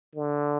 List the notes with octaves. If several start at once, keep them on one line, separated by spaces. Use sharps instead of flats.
D3